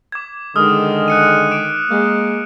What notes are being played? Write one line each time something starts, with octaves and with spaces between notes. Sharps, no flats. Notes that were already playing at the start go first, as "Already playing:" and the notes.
D6 G#6
D3 D#3 G#3 D#6 F6
F#6 C#7 D#7
D6 D7
G#3 A#3